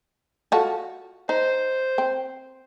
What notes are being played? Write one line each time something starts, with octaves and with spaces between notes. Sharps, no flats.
F4 F#4 A4
D#4 C5
C4